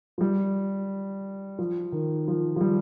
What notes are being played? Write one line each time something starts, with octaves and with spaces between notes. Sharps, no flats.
F3
G3
F3
D#3
F3
F3
G3